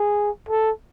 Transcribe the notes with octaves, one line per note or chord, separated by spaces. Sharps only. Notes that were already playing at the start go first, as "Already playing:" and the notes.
Already playing: G#4
A4